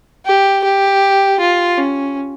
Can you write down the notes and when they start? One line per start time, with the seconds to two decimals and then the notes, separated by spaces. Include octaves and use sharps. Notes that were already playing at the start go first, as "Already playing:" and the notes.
0.26 G4
0.64 G4
1.40 F4
1.78 C#4